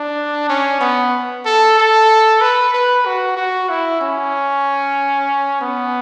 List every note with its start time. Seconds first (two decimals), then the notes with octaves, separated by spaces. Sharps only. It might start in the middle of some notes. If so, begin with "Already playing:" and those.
Already playing: D4
0.49 C#4
0.81 B3
1.45 A4
1.78 A4
2.41 B4
2.74 B4
3.06 F#4
3.37 F#4
3.69 E4
4.01 C#4
5.61 B3